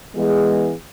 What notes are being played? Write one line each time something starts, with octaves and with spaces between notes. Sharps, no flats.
E3 G#3 B3 G#4